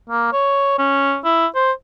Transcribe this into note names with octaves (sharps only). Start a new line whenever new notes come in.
A#3
C#5
C#4
E4
C5